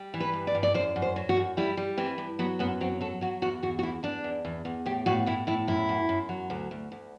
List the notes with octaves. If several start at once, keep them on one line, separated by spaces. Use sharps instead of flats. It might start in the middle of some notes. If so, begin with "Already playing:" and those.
Already playing: G3
E3
B4
G2
D5
G2
D5
F#2 C5
F#2
C5
F#3
F#4
F#2
G3 E4
G3
E3 C4
G2
F#3 B3
F#2 B3
F#3 C4
F#3 A4
F#3 F#4
E2 F#4
E2 F#4
F#4
E2 E4
E2 D4
E2
E2
E2
A2 G4
A2 F#4
A2 E4
A2 E4
F#2 E4
F#2
F#2
F#3
D2
D2
D2